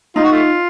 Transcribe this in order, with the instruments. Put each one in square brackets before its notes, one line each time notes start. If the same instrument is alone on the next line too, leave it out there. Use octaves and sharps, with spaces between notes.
[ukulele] D#4 [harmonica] F4
[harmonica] F#4
A3 F4